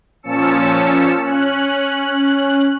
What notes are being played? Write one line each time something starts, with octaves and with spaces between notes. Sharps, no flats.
A#2 F3 C#4 A5 E6 C#7
C#4 F#6